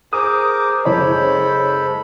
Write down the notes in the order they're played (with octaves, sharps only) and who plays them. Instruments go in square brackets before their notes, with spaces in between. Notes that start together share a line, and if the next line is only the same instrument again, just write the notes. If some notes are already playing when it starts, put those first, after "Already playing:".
[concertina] G#4 A#4 D6 [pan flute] C5 [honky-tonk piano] D#6
[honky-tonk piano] F#1 C#5 [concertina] G#3 A4 B5